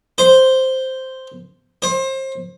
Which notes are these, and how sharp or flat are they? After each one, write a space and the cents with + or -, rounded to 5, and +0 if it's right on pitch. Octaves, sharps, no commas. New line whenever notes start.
C5 +0
C5 +30